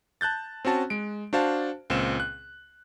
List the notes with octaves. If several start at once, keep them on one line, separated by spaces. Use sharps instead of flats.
A5 F#6 G6 A6
C4 C#4 F#4 A5
G#3 D7
D4 F#4 C5 F5 A5
C#2 A#2 C4 E7
F#6